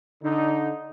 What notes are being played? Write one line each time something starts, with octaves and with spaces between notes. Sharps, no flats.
D3 D#4